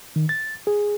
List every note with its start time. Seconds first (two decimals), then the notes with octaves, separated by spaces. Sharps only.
0.16 D#3
0.29 A6
0.67 G#4